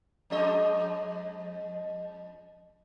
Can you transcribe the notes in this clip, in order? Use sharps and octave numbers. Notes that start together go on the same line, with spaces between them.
F2 G#3 D#5